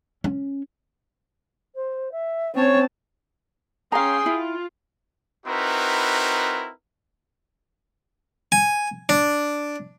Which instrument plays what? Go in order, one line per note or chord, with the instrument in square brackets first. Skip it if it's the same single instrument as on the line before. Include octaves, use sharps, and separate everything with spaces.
[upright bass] C#4
[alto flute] C5
E5
[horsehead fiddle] C4 A5 [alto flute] C#4 [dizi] C#5
[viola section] C#4 G5 C6 [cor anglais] G#4 [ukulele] F5 A#5
[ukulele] E4 [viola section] F4
[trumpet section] C4 D#4 E4 F#4 A#4 B4
[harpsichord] G#5
D4